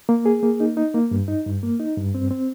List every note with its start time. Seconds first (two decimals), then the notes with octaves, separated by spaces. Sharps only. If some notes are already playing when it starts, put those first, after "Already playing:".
0.09 A#3
0.26 G#4
0.43 A#3
0.60 D#4
0.77 D#4
0.94 A#3
1.11 G2
1.28 D#4
1.46 G2
1.63 A#3
1.80 D#4
1.97 G2
2.15 C4
2.31 C4